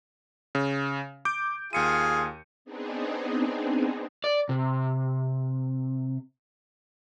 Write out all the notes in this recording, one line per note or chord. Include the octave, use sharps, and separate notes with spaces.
C#3
D6 G6 D7
D#2 F4 G#4 G#5 C#7 D#7
B3 C4 D4 D#4 G#4
D5
C3